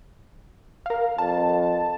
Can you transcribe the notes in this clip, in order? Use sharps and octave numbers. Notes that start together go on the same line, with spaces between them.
A#4 F5
F2 A5